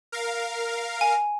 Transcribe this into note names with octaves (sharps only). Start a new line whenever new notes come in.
A#4 F5
G#5